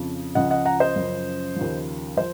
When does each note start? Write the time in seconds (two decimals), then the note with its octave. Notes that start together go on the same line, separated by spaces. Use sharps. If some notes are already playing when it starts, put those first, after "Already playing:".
Already playing: F2 C#3 F3
0.35 C#2 C#3 F3 D#5 F#5
0.50 D#5 F#5
0.65 F#5 A#5
0.80 C5 D#5
0.96 F#2 C#3 F3
1.56 D#2 C#3 F3
2.17 F3 C5